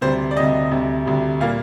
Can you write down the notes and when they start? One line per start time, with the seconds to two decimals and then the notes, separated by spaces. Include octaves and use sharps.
0.01 D2 C3 G3 C5
0.31 D5
0.36 D2 C3 G3 D#5
0.71 D2 C3 G3
1.05 D2 C3 G3
1.40 A#2 G3 A#3 F5